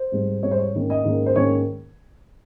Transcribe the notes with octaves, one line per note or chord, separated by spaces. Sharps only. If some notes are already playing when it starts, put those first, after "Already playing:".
Already playing: C5
G#2 G3 C4
G#2 G3 C4 C#5
C5
C#5
G#2 D#3 A#3 C#4
D#5
G#2 D#3 A#3 C#4
C5
G#2 D#3 A#3 C#4 C#5